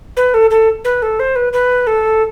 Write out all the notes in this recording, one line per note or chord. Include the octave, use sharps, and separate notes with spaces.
B4
A4
A4
B4
A4
C5
B4
B4
A4